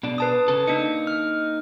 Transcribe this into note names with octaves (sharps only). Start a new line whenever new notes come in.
B2 D4
B4 A5 D#6
C#3 A4
A#3 D4 D#4 C#7
F6